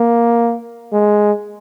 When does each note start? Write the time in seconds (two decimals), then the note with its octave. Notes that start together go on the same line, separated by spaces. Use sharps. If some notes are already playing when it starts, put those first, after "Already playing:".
Already playing: A#3
0.92 G#3